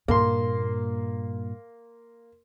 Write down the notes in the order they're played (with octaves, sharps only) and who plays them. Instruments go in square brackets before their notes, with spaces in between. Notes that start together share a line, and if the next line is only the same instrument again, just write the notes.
[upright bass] G2 A#2 [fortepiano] A#3 C6